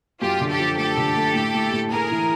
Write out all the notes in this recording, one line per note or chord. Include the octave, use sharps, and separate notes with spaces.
F#2 F4 G4
D3
G4 A4
F3
A3 G4 A4
D3
A3
A2
A2
A2
A2 G#4 A#4
E3